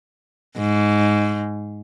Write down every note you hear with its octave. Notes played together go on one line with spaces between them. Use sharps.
G#2